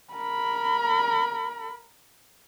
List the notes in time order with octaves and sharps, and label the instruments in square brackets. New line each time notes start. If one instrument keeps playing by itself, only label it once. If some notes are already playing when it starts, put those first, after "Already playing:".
[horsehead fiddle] A#4 B5